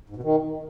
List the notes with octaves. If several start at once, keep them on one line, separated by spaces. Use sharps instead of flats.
G#2
B2
D#3